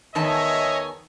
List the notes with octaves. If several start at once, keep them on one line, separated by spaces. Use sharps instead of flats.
E2 D#3 C#5 D#5 E5 G#5 A5